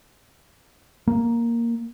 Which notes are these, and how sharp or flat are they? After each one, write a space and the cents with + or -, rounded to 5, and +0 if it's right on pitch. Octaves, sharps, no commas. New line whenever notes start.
A#3 +0